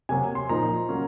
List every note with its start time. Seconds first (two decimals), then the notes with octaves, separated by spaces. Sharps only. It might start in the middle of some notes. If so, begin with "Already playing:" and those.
0.09 C3 F#3 A#3 G#5
0.35 C6
0.49 A#2 F3 A#3 D#4 A#5
0.89 F#3 A#3 C#4